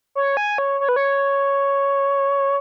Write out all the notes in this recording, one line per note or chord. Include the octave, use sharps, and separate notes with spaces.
C#5
G#5
C#5
C#5
B4
C#5